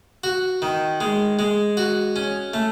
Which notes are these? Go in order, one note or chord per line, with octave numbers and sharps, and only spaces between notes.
F#4
D#3
G#3
G#3
F#4
C#4
A3